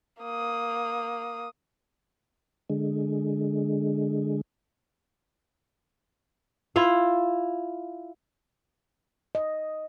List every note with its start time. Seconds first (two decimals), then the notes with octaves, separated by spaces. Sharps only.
0.22 A#3 D#6
2.70 D3 G#3
6.76 E4 F4 F5
9.35 D#5